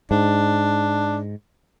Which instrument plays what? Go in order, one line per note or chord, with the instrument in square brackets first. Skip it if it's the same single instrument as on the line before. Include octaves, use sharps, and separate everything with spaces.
[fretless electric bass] G#2 [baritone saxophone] D4